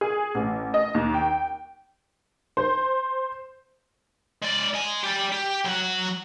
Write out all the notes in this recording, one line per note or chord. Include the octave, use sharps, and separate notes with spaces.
G#4
A1
D#5
D#2
G5
C5
G#3 D5
D#5 G#5
G4 D5
G4
F#3 F#5